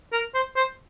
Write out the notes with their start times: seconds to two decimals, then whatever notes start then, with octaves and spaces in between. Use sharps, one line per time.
0.12 A#4
0.34 C5
0.56 C5